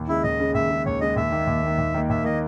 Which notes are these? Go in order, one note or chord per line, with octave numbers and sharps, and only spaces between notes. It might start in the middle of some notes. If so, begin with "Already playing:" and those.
Already playing: D#2
C#3 G#3 E4
D#2 D#5
C#3 G#3
D#2 E5
C#3 G#3
D#2 C#5
C#3 G#3 D#5
D#2 E5
D#3 A#3
D#2
D#3 A#3
D#2
D#3 A#3
D#2 E5
D#3 A#3 D#5